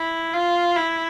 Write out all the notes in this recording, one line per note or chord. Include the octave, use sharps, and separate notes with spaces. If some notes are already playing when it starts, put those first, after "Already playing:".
Already playing: E4
F4
E4